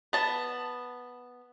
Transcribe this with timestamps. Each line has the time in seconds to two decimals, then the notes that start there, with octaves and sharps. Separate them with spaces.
0.13 B3 A5